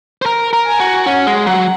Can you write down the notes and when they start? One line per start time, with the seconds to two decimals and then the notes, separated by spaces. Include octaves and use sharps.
0.22 C5
0.26 A#4
0.53 A#4
0.66 G#5
0.80 F#4
1.06 C#4 F#5
1.27 G#3
1.46 F#3 F#5